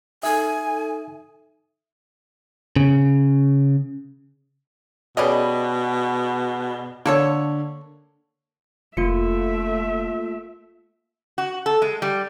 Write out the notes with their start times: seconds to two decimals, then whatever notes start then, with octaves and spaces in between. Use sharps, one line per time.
0.23 D#4 A4 E5 G#5
2.76 C#3
5.17 B2 G3 C#4 G#4 B4 D5 D#5
7.06 D3 A#3 A4 C#5
8.97 F1 A3 A#3 F4 E5 C#7
11.38 F#4
11.66 A4
11.82 G#3
12.02 G3